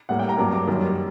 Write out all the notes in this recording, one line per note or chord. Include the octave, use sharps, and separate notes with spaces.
A2 G3 A#3 F#5
G5
A#5
G2 F#3 A#3 D6
D6
F#2 D#3 G3 A#3